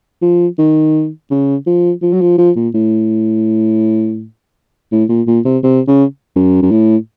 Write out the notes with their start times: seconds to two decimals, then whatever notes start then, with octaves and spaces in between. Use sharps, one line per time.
0.22 F3
0.58 D#3
1.30 C#3
1.66 F3
2.02 F3
2.13 F#3
2.21 F3
2.38 F3
2.56 A#2
2.74 A2
4.92 A2
5.09 A#2
5.27 A#2
5.45 C3
5.63 C3
5.87 C#3
6.36 F#2
6.62 F#2
6.71 A2